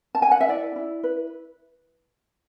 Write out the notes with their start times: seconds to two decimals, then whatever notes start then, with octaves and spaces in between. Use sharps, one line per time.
0.15 A5
0.22 G#5
0.31 F#5
0.41 E5
0.49 E4 D5
0.76 E4
1.04 B4